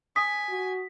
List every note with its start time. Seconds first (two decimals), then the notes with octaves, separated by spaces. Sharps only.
0.16 G#5 D#6 B6
0.50 F#4